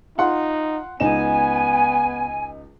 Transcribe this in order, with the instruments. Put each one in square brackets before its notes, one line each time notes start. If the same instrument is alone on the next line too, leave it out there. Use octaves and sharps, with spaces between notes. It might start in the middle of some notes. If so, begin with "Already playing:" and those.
[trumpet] D#4 [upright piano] F4 F#5 C6
[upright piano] C#2 D#4 E7 [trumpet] B3 [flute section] G#5